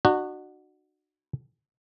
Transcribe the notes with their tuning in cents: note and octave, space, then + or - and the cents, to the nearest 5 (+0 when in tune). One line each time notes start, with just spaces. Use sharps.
D4 +45 F#4 +0